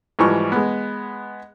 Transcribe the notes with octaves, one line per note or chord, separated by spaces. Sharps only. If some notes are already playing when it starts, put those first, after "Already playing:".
G#2 E3 F3 G3 C#6
G#3 B3